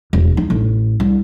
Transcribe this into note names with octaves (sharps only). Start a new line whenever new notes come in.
E1
D#4
A1
C2